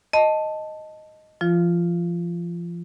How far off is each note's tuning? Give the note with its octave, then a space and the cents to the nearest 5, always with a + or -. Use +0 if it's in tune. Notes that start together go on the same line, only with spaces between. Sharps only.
D#5 +0 A5 +0
F3 -30 F4 -10